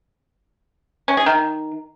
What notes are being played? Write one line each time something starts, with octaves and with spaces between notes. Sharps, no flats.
C#4
G#4
D#3